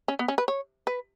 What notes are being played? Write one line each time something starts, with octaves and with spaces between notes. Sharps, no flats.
C#4
B3
C#4
B4
C#5
B4